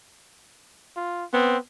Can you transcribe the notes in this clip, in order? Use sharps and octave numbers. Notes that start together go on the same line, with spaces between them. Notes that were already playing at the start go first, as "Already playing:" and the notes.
F4
B3 C4